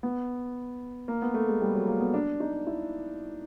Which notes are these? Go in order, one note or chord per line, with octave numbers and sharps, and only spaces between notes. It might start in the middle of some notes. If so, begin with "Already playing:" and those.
B3
A#3
B3
A3
G#3
G3
F#3
A#3
B3
D4
D#4
E4